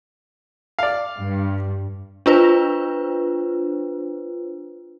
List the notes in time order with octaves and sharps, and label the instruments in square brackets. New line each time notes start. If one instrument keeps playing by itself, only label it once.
[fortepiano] D5 F5
[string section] G2
[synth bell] D4 F4 B4 C5